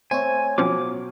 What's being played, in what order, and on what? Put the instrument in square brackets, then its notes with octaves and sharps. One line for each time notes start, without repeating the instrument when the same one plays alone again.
[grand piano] A3 C4 E5 [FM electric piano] C5 C#5 [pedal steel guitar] G#5
[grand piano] B2 F#3 [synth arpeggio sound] F3 C4 C#4 [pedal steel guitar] D6